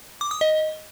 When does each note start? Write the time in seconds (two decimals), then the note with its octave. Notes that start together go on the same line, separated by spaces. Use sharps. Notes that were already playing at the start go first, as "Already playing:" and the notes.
0.21 D6
0.31 D#6
0.41 D#5